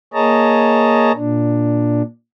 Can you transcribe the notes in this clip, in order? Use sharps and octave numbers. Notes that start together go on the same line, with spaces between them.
A#3 G#4 C#5 D#5 A5 A#5
A#2 D4